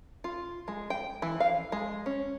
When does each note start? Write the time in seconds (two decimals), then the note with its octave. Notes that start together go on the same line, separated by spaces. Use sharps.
0.24 F4
0.68 G#3
0.90 G5
1.22 E3
1.40 F5
1.72 G#3
2.06 C#4